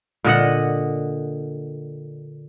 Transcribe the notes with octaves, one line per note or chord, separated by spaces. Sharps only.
A#2 D3 D#5 F#5